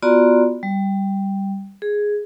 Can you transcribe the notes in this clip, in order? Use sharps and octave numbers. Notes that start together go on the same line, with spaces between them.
B3 F4 F#4 D5 A#5 C6
G3
G#4